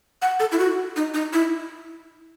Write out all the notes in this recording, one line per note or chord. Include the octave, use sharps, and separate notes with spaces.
F#5
A4
E4
F#4
D#4
D#4
E4